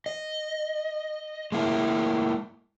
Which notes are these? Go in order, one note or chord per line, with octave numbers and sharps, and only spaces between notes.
D#5
G#3 A#3 E4